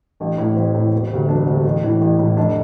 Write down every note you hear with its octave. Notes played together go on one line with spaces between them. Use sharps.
A1 D4
A2 E3
A1 C4
A2 E3
E1
D2 C3
E1 D4
D2 C3
A1
A2 E3
A1
A2 E3
F1 D4